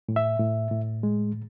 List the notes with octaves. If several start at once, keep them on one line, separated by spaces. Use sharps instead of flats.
A2
E5
A2
A2
G#3